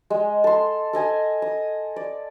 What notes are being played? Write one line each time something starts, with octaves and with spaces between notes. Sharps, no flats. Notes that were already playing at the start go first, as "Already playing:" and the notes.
G#3
A4 C6
A4 D#5 G#5 D#6
D#6
D5